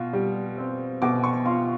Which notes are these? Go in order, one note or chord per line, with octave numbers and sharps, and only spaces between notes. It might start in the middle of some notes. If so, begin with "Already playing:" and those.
Already playing: B2 F4
G3
C4
B2 D6
C#6
F4 C6